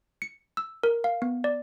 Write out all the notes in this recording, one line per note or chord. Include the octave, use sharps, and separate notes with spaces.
C#7
E6
A#4
F5
B3
D5